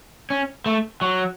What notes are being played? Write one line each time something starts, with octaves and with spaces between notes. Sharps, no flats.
C#4
A3
F#3